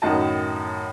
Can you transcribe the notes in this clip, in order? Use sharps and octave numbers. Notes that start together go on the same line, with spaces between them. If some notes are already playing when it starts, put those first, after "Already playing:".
F#2 A2 D#3 F#4 D#5 A5